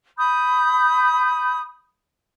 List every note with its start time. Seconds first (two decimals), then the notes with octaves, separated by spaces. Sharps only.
0.18 B5 D#6 G6